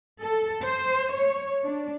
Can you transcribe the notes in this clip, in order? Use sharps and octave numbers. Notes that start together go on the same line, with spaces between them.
A4
C5
C#5
D4